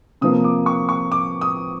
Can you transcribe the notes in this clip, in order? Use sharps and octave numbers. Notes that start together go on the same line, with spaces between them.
C3 F3 A#3 D#6
D6
C#6
C#6
D6
D#6